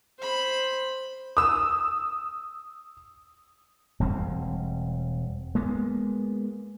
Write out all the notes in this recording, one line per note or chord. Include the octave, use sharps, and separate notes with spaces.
C5 B5
D#6 E6
E1 G2 G3 C4
G#3 A#3 B3